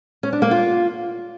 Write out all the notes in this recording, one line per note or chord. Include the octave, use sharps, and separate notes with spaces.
C#4
D4
A#3
F4